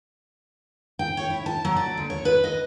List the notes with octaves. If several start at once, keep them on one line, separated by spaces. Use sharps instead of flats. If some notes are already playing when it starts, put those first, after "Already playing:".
G5
C#5
E4
A5
F#3
D5
D2
C#5
B4
D#5